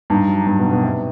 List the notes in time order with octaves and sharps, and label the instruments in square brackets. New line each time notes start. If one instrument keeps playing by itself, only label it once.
[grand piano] G2 [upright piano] D#4
[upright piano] F#3
[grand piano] G2 [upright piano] F#3
[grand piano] B2
[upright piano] G2
[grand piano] B2
[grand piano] C3 [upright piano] B3